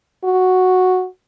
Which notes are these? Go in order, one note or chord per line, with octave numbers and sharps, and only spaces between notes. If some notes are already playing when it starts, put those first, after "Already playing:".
F#4